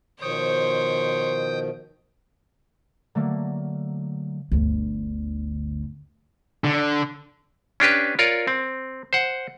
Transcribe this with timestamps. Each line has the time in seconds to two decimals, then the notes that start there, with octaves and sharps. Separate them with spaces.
0.21 B2 D#3 F3 C5 C#5 G5 D#6 G6
3.15 D3 F#3 A3 A#3
4.52 G1 D2
6.64 D3
7.80 C#4 D4 G4 B4
8.19 F4 A#4 C#5 D5
8.47 C4
9.13 C5 F#5